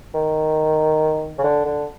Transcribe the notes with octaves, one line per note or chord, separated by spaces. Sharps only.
D#3
C#3
D3
D3